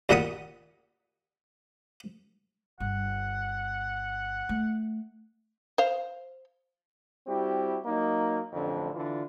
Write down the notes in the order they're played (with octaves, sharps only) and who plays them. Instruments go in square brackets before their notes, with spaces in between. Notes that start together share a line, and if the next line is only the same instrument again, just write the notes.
[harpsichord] D#2 A#2 D#3 F#5 B5 D#6
[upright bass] G1 [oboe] F#5
[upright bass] A3
[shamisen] C5 F5
[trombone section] G3 C4 E4 F#4 G4
F#3 A#3 D#4
A1 F2 D3
D3 E3 F4